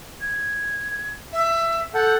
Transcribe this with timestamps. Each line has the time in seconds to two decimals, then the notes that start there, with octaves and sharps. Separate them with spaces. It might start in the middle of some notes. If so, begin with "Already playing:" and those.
0.20 G#6
1.33 E5
1.95 A4 F#5 G6